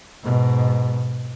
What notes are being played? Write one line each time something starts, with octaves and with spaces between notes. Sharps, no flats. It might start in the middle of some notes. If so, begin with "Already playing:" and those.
G#2 B2